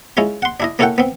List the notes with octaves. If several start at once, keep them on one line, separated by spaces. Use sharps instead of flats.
G#3 C#4 E4 F4
F#5 C6
D4 E4 D#5
A#3 C#4 E4 A4 F#5 G5
B3 C4